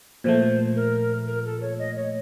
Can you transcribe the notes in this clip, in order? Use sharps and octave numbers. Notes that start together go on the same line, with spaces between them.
A#2 F3 A3 C5
A#4
A#4
A4
C#5
D#5
C#5